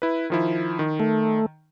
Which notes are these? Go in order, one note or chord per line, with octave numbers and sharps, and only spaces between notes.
E4 B4
D#3 F3 E4
D#3
A3